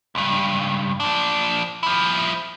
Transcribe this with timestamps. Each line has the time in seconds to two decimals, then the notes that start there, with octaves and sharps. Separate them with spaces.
0.15 C#2 G2
1.00 F3 D4
1.83 F3 E4